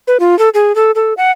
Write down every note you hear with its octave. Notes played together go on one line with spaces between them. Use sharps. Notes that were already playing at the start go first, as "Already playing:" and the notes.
B4
F4
A4
G#4
A4
A4
F#5